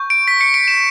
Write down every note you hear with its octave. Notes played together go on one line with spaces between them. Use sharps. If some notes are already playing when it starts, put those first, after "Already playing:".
Already playing: C#6 G6
D7
B6
C#7
D7
E7